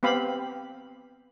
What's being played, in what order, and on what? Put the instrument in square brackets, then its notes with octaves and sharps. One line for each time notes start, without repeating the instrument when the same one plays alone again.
[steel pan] B3 C4 G4 F5 B5